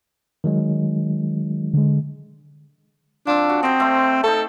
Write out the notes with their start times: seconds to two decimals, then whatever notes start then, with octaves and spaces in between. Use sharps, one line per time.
0.44 D#3 F#3 G#3
1.73 D3 G#3
3.27 F3 C4 D4
3.49 F#4
3.63 C4 D#5 G5
3.80 A3 C5
4.23 A3 D#4 A4